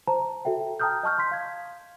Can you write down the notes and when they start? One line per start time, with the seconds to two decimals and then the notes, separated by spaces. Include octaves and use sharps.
0.07 C5 A5 A#5
0.45 F#4 A4 E5 G5
0.80 G5 A5 A#5 D#6 F6 G6
1.03 D#5 A5 C#6 F6 G6
1.18 C6 B6
1.31 F5 G#6